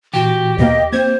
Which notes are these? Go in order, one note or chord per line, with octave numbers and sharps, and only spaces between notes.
A#2 E3 F#4 G4
D#2 B2 A#3 D#5
A#3 C4 C5 G#6